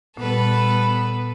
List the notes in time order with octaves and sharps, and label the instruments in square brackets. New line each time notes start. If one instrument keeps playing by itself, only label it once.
[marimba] A#2 [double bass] G3 B3 [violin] A4 B4